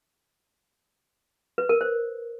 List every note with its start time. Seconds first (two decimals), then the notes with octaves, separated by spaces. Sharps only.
1.58 B4
1.69 A#4
1.81 C5